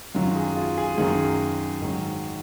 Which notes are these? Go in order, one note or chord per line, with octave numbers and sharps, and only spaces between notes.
F#2 D#3 F#3 F4
G#4
F4
G#4
F#2 D#3 F#3 G#4
G#2 D#3 F#3